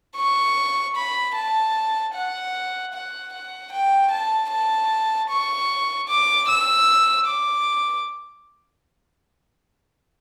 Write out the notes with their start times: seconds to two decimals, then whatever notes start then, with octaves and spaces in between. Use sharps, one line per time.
0.16 C#6
0.96 B5
1.35 A5
2.14 F#5
2.93 F#5
3.33 F#5
3.72 G5
4.11 A5
4.51 A5
5.30 C#6
6.08 D6
6.48 E6
7.27 D6